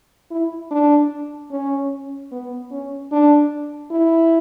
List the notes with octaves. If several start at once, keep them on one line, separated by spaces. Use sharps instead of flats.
E4
D4
C#4
B3
C#4
D4
E4